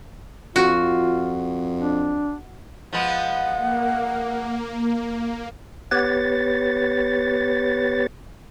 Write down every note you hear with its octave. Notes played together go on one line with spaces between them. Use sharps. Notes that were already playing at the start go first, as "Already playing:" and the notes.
F2 F4 F#4
D4
F3 G#3 B3 F#5
A#3
B3 G4 B4 C#5 A6